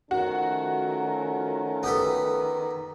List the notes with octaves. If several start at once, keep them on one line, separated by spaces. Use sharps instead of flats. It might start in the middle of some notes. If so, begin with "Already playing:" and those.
D#3 F3 A3 C#4 F#4
B3 G4 A4